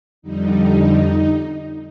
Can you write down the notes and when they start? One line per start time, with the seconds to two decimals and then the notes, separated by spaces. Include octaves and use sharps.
0.22 F2 D3 G3 D#4